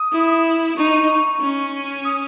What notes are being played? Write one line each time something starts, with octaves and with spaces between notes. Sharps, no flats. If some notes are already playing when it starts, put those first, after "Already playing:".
Already playing: D#6
E4
D#4 C#6
C#4
D#6